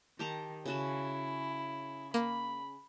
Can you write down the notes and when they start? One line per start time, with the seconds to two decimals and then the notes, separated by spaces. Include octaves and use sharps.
0.19 D#3 G4 A5 A#5
0.66 C#3 E4 F#4 A5
2.14 A#3 B5